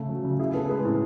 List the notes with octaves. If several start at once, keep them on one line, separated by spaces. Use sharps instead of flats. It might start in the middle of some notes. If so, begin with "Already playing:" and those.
Already playing: C#3 A3 A4
F#3
C#3
E4 G#4
B3 A4
G#3 G#4 B4
A2